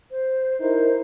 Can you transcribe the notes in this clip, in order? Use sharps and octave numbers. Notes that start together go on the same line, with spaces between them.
C5
D#4 E4 A#4 C5